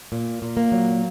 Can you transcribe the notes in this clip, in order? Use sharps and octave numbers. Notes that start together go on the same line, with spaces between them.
A#2
A#2
A#3
F#3